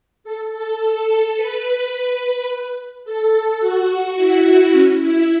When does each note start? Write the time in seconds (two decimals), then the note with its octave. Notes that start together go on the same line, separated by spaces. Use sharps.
0.24 A4
0.52 A4
1.36 B4
3.05 A4
3.60 F#4
4.16 E4
4.72 C#4
5.01 E4